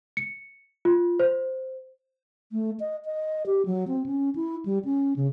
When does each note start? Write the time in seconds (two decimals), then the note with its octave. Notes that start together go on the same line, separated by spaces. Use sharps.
0.17 C#7
0.85 F4
1.20 C5
2.52 A3
2.80 D#5
3.05 D#5
3.46 G4
3.66 F#3
3.88 C4
4.06 C#4
4.36 E4
4.66 G3
4.85 C#4
5.16 C#3